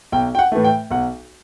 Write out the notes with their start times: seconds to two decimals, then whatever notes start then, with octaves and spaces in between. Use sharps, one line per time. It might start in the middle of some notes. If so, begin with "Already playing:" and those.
0.12 B1 G5
0.35 G5
0.39 F#5
0.52 A2 E3 A3
0.64 G5
0.91 B1 F#5